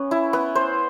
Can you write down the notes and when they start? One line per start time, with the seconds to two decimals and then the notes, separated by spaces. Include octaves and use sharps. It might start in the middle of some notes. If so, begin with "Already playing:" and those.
Already playing: B3 C#4
0.11 E4
0.33 B3
0.55 C5